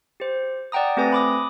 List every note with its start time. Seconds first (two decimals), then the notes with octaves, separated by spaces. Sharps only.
0.20 G4 C5
0.72 D5 F#5 G5 A#5 D#6
0.97 A3 C4 G4 B4 G#5 A#6
1.12 B5 D6 D#6